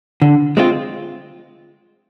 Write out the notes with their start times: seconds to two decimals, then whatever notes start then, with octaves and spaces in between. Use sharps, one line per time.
0.22 D3
0.57 G#3 C4 F4